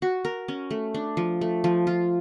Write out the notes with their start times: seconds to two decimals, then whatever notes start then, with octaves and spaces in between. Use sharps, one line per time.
0.02 F#4
0.25 A#4
0.48 C#4
0.71 A3
0.94 D4
1.17 F3
1.41 A3
1.64 F3
1.87 F4